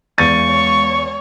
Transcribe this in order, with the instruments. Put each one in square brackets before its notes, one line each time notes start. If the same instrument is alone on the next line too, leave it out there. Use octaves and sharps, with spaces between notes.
[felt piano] E2 A6 D#7 [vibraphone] G#3 F5 [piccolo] C#6
[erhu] C#5